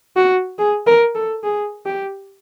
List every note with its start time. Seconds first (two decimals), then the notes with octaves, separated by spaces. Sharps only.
0.16 F#4
0.59 G#4
0.87 A#4
1.15 A4
1.43 G#4
1.86 G4